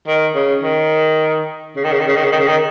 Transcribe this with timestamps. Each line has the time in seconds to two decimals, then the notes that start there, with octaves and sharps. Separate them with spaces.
0.08 D#3
0.36 C#3
0.63 D#3
1.76 C#3
1.84 D#3
1.92 C#3
2.00 D#3
2.08 C#3
2.16 D#3
2.25 C#3
2.32 D#3
2.40 C#3
2.48 D#3